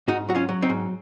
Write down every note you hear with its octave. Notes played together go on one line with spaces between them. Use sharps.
G#2 D#4 F#4
F#3 F#4
C#4 F4
F#3
C4 D#4
G#2